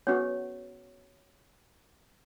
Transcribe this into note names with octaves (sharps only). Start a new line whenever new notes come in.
B3 C#4 F#4 C#5